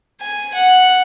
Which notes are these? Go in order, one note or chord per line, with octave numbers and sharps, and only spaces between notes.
G#5
F#5